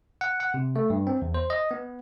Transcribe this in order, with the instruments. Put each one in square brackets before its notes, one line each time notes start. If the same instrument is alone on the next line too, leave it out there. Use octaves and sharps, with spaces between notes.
[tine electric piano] F#5
F#5
C3
A3
G2
C4
E2
C5
D#5
B3